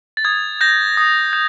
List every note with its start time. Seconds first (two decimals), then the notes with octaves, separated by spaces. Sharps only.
0.17 A6
0.25 D#6 G#6
0.61 G6 A#6
0.97 D#6
1.33 G6